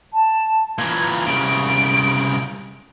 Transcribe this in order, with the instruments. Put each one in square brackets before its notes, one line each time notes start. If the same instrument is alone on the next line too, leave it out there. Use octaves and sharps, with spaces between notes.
[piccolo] A5
[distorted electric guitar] A#2 E3 [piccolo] G#6
[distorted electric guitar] C2 C#3 [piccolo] D7